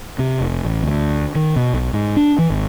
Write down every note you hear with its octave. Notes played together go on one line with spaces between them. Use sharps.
C3
F1
A1
D2
D#3
B2
B1
G#2
D4
E3
G#1